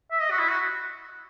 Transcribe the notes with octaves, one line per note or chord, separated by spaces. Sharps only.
E5
D#5
F#4
E4
F#4